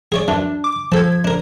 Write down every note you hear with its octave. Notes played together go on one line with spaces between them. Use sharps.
G#4 C#5 D5
F#2 E3 D4
D6
F3 A4 A5 G#6
D4 A#4